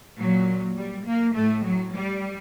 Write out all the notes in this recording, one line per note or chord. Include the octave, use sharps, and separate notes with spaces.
A#2 F#3
G3
A#3
A2 A3
F#3
G3